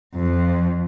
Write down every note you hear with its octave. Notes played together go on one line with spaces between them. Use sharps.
F2